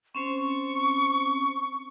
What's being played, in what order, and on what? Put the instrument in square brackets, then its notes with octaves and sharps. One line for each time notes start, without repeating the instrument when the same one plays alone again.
[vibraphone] C4 C#4 C5 [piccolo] C#6